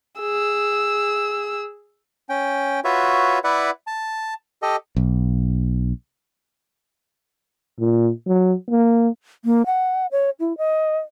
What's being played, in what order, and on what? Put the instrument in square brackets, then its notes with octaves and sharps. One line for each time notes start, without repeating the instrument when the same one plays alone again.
[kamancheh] G#4 E6
[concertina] C#4 G5
F4 F#4 B4 C#5 E5
E4 B4 D5 E5 F#5
A5
G4 A4 D#5
[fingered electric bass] B1
[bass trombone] A#2
F#3
A#3
[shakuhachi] A#3
F#5
C#5
E4
D#5